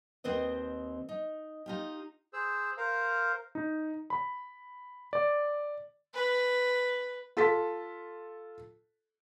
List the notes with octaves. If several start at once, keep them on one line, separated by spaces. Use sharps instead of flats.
D#2 C4 B4 C5 D#5
D#4
D#4 F4 G4
G#4 C5 E6
A#4 C5 F5
D#4
B5
D5
B4
F4 A4 B6